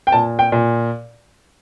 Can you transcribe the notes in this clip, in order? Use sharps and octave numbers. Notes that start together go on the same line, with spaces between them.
G5
A#2 A5
G5
A#2